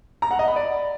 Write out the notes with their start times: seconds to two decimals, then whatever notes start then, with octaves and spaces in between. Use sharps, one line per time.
0.22 A#5
0.31 F#5
0.39 D#5
0.48 B5
0.56 D5